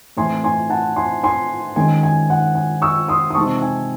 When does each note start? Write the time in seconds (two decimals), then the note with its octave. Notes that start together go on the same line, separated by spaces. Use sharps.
0.17 A2 E3 C4 G#5 C6
0.44 G#5 C6
0.70 F#5 A5
0.96 G#5 C6
1.23 G#5 C6
1.76 D#3 G#3 C#4 G#5
2.03 G#5
2.30 F#5
2.55 G#5
2.82 C#6 E6
3.08 C6 D#6
3.31 D#6
3.35 C3 E3 G#3 C4 D#4 A5 C#6
3.62 G#5